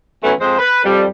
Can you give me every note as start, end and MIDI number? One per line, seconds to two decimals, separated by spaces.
0.23 0.33 52
0.23 0.33 54
0.23 0.33 57
0.23 0.33 59
0.23 0.33 61
0.40 0.57 41
0.40 0.57 56
0.40 0.57 72
0.59 0.82 71
0.84 1.04 41
0.84 1.04 55